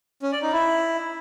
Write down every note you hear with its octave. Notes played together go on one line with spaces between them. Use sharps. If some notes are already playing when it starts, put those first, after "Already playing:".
C#4
D5
D#4
E4